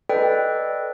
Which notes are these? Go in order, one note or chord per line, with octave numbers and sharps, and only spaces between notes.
A4 B4 D5 D#5 G5